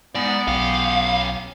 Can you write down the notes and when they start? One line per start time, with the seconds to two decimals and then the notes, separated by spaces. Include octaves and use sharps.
0.15 G#2 B3 D5
0.47 B1 C#4 G4 F5